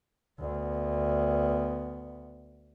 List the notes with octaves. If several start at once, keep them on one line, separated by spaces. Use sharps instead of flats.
D2 B3